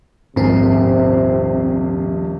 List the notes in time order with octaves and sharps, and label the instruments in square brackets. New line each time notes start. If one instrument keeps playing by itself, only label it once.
[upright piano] D#1 A#1 A#4 [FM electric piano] G#2 C4 [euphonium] C3